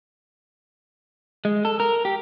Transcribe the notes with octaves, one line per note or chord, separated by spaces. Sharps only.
G#3
A4
A#4
G4